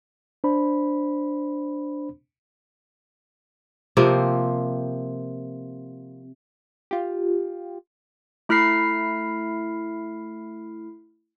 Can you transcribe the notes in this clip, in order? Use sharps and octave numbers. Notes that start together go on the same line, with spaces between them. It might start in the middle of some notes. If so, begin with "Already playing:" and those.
D4 C5 B5
C3 F3 A#3 C4
F4 G4
A3 E4 F6 B6 C7